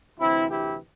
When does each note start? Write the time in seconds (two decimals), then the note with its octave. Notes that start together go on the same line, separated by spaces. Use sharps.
0.18 D2 C3 E3 C4 E4
0.48 E4 G4